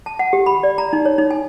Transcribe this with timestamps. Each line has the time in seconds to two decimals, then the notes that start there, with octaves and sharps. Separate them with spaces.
0.06 A5
0.19 F#5
0.33 G4
0.46 B5
0.63 D5
0.78 A#5
0.93 D#4
1.05 C#5
1.18 D#4
1.31 G#5